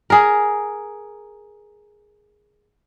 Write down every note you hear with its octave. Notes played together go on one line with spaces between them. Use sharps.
G#4 A#4